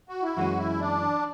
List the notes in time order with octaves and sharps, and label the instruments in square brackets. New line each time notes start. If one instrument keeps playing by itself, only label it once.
[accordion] F#4
E4
[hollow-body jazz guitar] F#2 E3 G#3 C#4 [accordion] F#4
[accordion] E4
D4